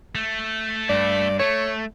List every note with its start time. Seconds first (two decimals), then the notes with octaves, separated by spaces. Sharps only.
0.15 A3
0.90 G2 D5
1.39 A3 C#5